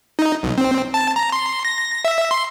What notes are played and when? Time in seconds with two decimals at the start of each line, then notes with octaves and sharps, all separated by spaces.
0.19 D#4
0.43 B1
0.58 C4
0.94 A5
1.16 A#5
1.32 C6
1.65 A#6
2.05 E5
2.31 C6